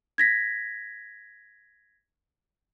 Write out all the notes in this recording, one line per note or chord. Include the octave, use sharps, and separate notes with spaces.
G#6 A#6 B6